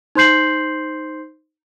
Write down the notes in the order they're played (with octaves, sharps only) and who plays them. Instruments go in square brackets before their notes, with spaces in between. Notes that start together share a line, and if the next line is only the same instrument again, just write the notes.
[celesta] D#4 C5 C6 G6 C7 F#7